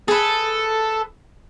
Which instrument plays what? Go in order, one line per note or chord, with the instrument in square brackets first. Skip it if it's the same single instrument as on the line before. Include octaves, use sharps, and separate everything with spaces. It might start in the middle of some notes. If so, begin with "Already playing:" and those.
[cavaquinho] G#4 B4 [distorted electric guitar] A4